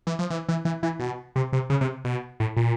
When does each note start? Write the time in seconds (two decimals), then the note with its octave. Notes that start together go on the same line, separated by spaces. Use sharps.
0.07 E3
0.19 F3
0.30 E3
0.49 E3
0.65 E3
0.83 E3
1.00 B2
1.36 C3
1.53 C3
1.70 C#3
1.81 C3
2.05 B2
2.40 A2
2.57 A#2